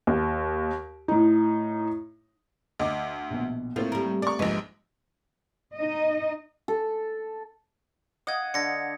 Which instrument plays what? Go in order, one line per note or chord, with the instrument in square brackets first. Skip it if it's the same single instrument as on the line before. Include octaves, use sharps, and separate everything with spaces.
[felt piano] D#2
A2 D#4
[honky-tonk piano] D2 [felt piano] D#5 D6
[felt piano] A#1 B2
[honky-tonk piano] A2 [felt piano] A3 A#3 C4 [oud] F4
[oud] G3 A#4
[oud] A#4 [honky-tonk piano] D5 C#6
[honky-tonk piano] A#1 G#2 [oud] B4 [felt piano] D#5
[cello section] D#4 D#5
[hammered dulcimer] A4
[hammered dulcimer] D#5 F5 F#5 [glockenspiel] D#6 G#6
[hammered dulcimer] D3 [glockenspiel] G#6 A#6 C#7